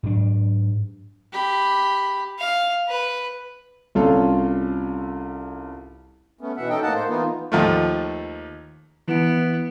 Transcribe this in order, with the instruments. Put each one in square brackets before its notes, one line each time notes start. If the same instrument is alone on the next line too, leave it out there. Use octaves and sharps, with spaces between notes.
[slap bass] G#2 F#3 D4
[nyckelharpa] G4 B5
[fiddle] F5
B4
[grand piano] C2 C#4 F4 A4
[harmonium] A3 B3 C#4
B2 E3 E5 F#5
C#4 D#4 A4 D#5 G5
A2 A#3 D#5 F#5 A5
A#3 C5
E3 A#3 B3 D#4 F4
[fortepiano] D#2 F3 A3
[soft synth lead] E3 [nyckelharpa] B3 [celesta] E4 F#5 D7